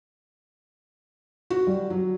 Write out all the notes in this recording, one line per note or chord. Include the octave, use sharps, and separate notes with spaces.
F#4
G3
F#3